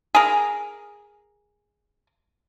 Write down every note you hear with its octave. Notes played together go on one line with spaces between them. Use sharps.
G#4 A#4